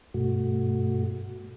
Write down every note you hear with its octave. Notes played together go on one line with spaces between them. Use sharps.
G2 B2 A3 F#4